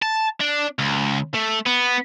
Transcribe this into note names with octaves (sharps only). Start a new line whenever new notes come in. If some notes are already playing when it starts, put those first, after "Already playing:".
A5
D4
C#2
A3
B3